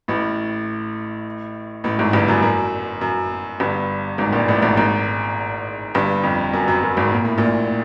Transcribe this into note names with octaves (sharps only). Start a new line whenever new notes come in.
A1 A2
A1 A2
G#1 G#2
G1 G2
F#2
F#2
F#2
G1 G2
G#1 G#2
A#1 A#2
A1 A2
G#1 G#2
G#1 G#2
G1 G2
F2
F#2
F#2
F#2
G#1 G#2
A#2
A2
A#1 A#2